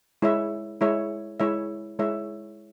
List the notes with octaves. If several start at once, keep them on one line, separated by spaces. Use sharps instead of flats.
G#3 E4 C#5 E5
G#3 E4 C#5 E5
G#3 E4 C#5 E5
G#3 E4 C#5 E5